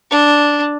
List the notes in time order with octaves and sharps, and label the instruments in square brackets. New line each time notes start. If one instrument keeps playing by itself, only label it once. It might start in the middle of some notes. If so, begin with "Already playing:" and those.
[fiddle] D4